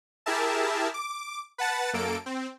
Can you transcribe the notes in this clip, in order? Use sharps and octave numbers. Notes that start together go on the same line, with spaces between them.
E4 G4 G#4 A#4 E5 A5
D6
B4 F#5 A5 A6
F#2 A#3 A4 D7
C4